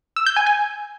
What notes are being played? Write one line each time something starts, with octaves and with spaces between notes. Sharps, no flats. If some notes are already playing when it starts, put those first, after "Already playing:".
E6
G6
G#5
G#5